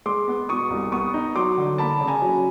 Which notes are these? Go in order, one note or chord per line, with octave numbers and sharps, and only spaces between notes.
G#3 C6 D6
B3
B2 C#6 D#6
C2
B3 C#6 D#6
D#4
F#3 C6 D6
D3
A#3 A5 B5
C#3
G#5 A#5
F#3